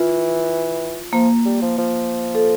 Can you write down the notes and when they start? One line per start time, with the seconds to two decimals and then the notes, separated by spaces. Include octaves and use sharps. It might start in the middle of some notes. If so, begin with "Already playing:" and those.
Already playing: E3 F4
1.13 F3 A#3
1.46 G3
1.62 F3
1.79 F3
2.35 A4